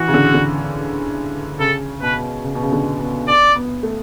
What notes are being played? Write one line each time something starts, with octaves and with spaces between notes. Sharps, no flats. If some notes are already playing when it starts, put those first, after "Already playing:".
Already playing: E3 F#4
C#3
D3
D3
C#3 A4
B2 B4
C#3
B2
C#3
D3
B2
D5
B3
A3